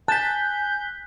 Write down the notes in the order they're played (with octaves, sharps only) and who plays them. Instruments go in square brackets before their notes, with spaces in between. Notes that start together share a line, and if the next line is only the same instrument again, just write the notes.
[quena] G#5 [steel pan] A5 [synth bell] F#6 B6 [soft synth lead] G6